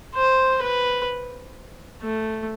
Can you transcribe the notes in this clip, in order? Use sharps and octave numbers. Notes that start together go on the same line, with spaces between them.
C5
B4
A3